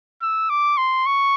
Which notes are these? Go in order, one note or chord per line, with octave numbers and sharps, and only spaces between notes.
E6
D6
C6
C#6